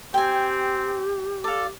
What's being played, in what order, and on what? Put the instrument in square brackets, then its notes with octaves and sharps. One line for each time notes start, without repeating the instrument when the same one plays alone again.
[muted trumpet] C4 [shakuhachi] G4 [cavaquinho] G5 G#5
[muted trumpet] A4 [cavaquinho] D5 F5